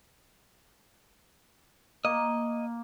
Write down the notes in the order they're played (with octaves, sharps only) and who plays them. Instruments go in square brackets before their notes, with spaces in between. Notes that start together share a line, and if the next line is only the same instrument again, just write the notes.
[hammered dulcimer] A#3 [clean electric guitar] D#5